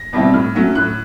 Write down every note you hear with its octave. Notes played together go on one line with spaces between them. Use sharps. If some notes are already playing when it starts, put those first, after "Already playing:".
Already playing: A#6
B2 G3 C4 E4
A2 F6
F#3 A3 C#4
A2 F#6